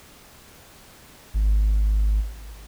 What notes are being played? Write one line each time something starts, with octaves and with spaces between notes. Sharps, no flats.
G#1